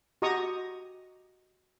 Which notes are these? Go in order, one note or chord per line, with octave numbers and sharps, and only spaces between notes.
F#4 G4 D#5 A#5 C#6 D#6